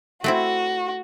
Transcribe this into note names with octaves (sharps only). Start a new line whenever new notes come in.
A3 C4 E4 F#4